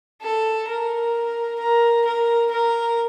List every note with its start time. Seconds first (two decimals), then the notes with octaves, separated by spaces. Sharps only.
0.21 A4
0.67 A#4
1.59 A#4
2.05 A#4
2.51 A#4